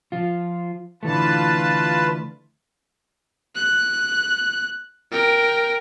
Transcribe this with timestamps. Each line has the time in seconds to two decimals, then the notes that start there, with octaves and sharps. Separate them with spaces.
0.12 F3 F4
1.03 D3 E3 A3 F4 B4 A5
3.55 F#6
5.12 A#4 G5